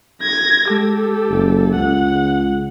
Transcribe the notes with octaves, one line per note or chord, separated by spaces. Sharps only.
G#6 A#6
G#3 G4 A4
F#1
C#2 F#5